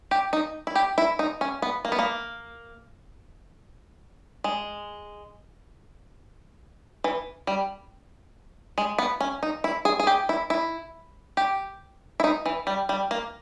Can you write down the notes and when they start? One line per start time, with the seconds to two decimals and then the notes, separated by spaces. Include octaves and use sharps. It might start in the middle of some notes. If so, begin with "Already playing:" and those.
0.11 G4
0.33 D#4
0.67 E4
0.75 G4
0.98 E4
1.19 D#4
1.41 C#4
1.62 B3
1.85 A#3
1.92 B3
1.99 A#3
4.44 G#3
7.04 E3
7.47 G3
8.78 G#3
8.98 B3
9.21 C#4
9.43 D#4
9.64 E4
9.85 G#4
10.00 G#4
10.07 G4
10.29 E4
10.50 E4
11.37 G4
12.20 E4
12.24 D#4
12.46 E3
12.67 G3
12.89 G3
13.11 A#3